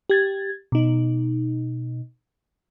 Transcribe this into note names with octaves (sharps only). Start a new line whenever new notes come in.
G4 G#6 A6
B2 D#4